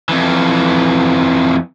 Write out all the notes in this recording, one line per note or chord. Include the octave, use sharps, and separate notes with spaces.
F2 E3